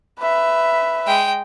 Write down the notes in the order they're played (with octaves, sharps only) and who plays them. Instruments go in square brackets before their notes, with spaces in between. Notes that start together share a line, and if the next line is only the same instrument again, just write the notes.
[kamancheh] B4 E5
[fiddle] G#3 G5